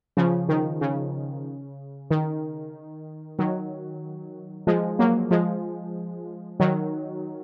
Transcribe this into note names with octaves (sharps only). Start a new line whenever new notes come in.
C#3 F3
D#3
C#3
D#3
D#3 F#3
F3 G#3
F#3 A#3
F3 G#3
D#3 F#3